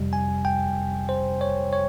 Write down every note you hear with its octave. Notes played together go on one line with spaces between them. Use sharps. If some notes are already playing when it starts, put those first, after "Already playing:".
Already playing: F2 C3 G3
G#5
G5
C5
C#5
C#5